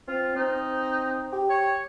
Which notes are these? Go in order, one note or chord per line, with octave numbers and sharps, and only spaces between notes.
C4 F4
C4 D#4
G4
C#5